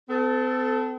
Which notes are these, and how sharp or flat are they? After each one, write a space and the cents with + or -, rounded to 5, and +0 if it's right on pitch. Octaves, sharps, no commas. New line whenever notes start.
C4 -45 A4 +0